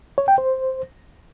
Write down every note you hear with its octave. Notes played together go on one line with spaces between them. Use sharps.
C#5
G5
C5